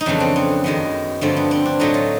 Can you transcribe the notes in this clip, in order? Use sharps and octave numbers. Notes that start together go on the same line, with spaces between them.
D#4
F2 C#3 E3 A3 D4
C4
B3
F#2 D#3 G#3 B3
G2 D3 F3 A3 C4
B3
C4
D4
A2 F#3 A3 D#4
F4